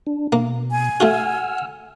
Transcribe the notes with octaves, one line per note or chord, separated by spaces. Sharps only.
D4
B2 A#3
G#5
A3 F4 F#4 F#5 E6 F6